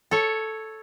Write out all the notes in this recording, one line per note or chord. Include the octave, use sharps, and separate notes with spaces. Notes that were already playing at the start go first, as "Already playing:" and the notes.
A4 C#5